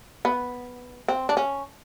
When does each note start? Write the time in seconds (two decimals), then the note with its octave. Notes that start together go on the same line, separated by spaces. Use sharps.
0.25 B3
1.08 C4
1.29 D4
1.37 C#4